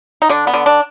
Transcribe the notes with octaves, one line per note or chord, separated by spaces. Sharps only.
D#4
D3 D4
B3
D3
D4